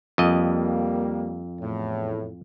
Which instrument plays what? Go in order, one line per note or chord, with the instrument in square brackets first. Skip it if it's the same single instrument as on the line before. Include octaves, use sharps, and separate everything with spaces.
[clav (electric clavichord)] F2 D#5 [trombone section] G3 A#3
[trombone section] E2 A2